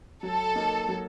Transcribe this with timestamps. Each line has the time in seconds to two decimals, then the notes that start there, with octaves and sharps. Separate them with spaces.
0.23 F#3 A4
0.55 A#3 D#4
0.89 F#3